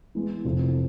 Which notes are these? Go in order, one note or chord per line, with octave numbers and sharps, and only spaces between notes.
E3 G#3 B3
F1 F2 C3 E3